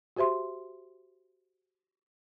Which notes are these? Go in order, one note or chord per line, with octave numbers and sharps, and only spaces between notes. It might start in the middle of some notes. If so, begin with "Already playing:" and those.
F#4 G4 C5 E5 C6